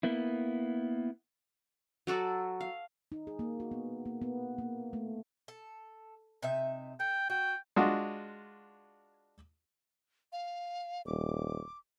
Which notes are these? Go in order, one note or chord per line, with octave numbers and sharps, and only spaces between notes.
A#3 B3 E4
F#3 F#4 A4 D5
F5
D#4
G#4
A#3
F#4
B3
A#3
B3
A#3
A3
A4
C3 D#4 E5
A4 G5
F#4 G5
G#3 D4 F4 F#4
F5
D#1 D6